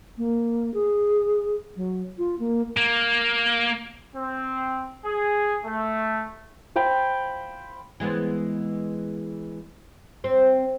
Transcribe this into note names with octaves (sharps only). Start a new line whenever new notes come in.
A#3
G#4
F#3
F4
A#3
A#3
C4
G#4
A3
C5 F5 G5 B5
E3 G#3 B3
C4